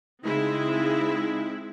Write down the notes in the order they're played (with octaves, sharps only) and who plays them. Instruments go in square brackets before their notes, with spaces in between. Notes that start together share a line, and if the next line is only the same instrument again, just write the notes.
[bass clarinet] C#3 [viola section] G#3 C4 E4 [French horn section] D#4